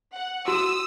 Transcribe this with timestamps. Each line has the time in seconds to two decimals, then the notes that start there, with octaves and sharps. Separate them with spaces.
0.13 F#5
0.48 F#4 D#6 E6